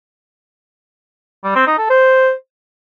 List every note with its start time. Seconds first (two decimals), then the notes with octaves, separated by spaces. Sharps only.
1.44 G3
1.56 C4
1.67 D#4
1.79 A4
1.90 C5